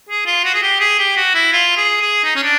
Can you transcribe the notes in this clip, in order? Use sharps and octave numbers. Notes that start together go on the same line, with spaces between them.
G#4
F4
F#4
G#4
G4
G#4
G4
F#4
E4
F4
G#4
G#4
D#4
C#4
D4